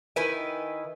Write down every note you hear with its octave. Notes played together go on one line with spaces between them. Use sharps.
D#3 E4 B4 G#5